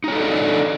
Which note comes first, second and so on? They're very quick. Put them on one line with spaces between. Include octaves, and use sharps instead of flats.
D#4 C#5 A4 D#5 D4